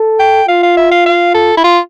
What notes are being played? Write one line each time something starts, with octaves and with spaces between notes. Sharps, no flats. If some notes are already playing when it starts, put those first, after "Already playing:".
Already playing: A4
G5
F4 F5
F5
E5
F5
F5
A4
E4
F4